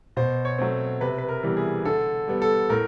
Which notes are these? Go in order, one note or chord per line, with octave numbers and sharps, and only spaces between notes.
B2 C5
C#5
F#3 A3 C4
C3 B4
B4
A#4
E3 G3 B3
G#4
D3 A4
G3 B3
A4
A2 A#4